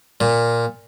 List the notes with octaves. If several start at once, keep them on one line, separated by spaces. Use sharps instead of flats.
A#2